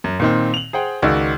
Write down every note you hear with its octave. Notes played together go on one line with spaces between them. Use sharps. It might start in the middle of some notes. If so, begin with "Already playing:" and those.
F#2
A#2 D#3 C4
F7 F#7
G#4 C5 F#5 G5
C#2 D#3 F#4 D5 E6